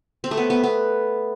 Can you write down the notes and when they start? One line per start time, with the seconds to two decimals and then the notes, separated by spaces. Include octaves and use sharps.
0.24 C4
0.31 A3
0.37 B3
0.50 B3
0.64 B3